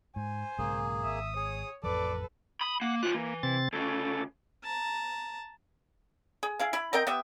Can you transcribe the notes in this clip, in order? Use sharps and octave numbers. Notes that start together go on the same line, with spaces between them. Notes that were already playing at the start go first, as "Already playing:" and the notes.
G#2 C5 G#5
B1 G#2 C#3 A#3 G#4
G#1 E5 D#6
G#4 C#5
A1 F2 F3 A4 B4 D5 D6
B5 D#6
A#3 F#5
D#3 F4 F#6
E3 A#3
C3 C4 A6
D2 C#3 A4
A5 A#5
G#4
E4 G#4 F5
E4 B5
C4 A#4 D#5 G5
B3 G4 E5